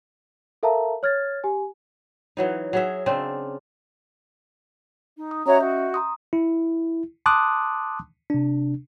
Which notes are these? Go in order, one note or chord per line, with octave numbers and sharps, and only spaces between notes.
A4 A#4 E5 F5 A5 A#5
C#5 F6 G#6 A6
G4 G#5
E3 F#3 D#4
F#3 G#4 E5
C#3 C4 D4
D#4
D#6
C#4 F#4 C#5 D#5 E5 A#5
F#4 G6
A#5 C6 D#6
E4
A5 C6 D6 D#6 F#6
C3 D4